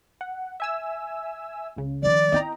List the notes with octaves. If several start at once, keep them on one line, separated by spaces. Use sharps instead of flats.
F#5
E5 G#5 E6
C#2 C#3
D#3 F3 D5
C4 E4 D#5 G5 A#5